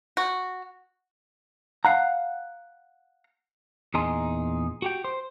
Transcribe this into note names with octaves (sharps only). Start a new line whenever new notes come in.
F#4
F5 F#5 A#5
E2 A#2 D#4 G#4 C6
F#4 G4 G5
C5